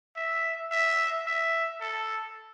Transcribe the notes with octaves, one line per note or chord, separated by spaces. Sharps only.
E5
E5
E5
A4